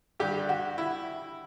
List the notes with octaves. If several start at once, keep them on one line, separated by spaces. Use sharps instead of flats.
G2 D3 G3 G4
F#4
E4